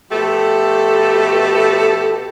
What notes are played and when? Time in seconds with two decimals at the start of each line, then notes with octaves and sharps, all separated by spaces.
0.11 B2 F3 A3 G4 A4